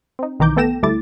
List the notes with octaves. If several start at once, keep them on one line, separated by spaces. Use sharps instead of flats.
C4 D#4
B1 D#3 E3 A#5 D6 G6
A3 B3 A4 G5 A#6 E7
D2 G3 A3 E4 D6 A6